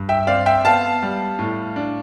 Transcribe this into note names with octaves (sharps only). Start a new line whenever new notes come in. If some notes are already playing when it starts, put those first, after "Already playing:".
Already playing: G2
E5 G5
C4 D5 F5
E5 G5
B3 F5 A5
G3
A2
D4